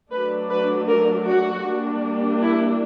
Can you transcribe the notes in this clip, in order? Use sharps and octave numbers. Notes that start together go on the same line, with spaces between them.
F#3 A3 D4 B4
B4
A#4
F#4
G3 A#3 D4
E4